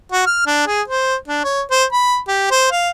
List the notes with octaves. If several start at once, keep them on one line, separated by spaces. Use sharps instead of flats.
F#4
F6
D4
G#4
C5
D4
C#5
C5
B5
G4
C5
F5